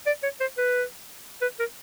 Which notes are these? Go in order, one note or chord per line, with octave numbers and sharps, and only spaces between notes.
D5
C#5
C5
B4
B4
A#4